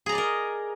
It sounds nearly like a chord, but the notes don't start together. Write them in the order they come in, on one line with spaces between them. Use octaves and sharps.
G#4 A#5 D5 D#5 A#4